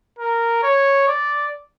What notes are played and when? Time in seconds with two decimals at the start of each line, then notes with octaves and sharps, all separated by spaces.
0.19 A#4
0.63 C#5
1.07 D5